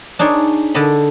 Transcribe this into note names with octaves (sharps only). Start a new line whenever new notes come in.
D4 D#4 G#4 C#5 D5
D3 A4 D5 D#5 B5